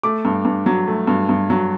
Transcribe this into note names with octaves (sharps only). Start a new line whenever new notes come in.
A3 D6
G2
G2
F#3
A3
G2
G2
F#3